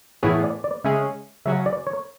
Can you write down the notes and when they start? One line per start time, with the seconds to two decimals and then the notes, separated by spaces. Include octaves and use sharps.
0.23 A2 E3 B3 E4 G#4 C#5
0.43 D5
0.64 D5
0.84 C#3 G#3 C#4 G#4 E5
1.46 C#3 F#3 C#4 F#4 E5
1.66 D5
1.87 C#5